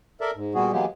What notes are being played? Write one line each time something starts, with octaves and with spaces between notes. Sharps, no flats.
A4 A#4 D5 E5
G#2
A#2 G3 B3 F#4 G#4
E3 F#3 G#3 A#3 B3 G4